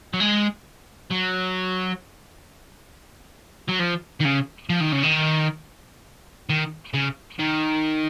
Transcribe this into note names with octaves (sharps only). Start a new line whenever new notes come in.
F#3
G#3
F#3
F#3
F3
D#3
C#3
F3
D#3
C#3
D#3
D#3
C#3
D#3